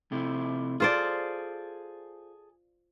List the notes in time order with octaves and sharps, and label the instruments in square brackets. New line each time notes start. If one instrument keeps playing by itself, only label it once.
[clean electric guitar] C3 A3 E4
[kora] F4 C5 D5 [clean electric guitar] G#4 A4